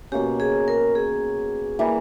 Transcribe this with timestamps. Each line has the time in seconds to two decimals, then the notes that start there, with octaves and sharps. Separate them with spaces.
0.12 B2 A#3 C#4 G4
0.40 G#4
0.68 A#4
0.95 G#4
1.79 E3 G3 A#3